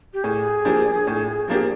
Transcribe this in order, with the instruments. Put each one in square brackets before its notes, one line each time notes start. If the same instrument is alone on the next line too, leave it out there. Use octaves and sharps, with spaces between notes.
[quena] G4
[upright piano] A2 [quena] G#4
[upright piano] F3 A#3 D4 G4
A2
F3 A#3 D4 G4